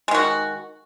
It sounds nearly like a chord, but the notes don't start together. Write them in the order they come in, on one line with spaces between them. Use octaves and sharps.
G#3 D#3 F#4